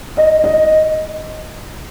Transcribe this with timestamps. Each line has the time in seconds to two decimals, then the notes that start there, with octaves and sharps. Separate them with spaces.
0.17 D#5
0.44 D#5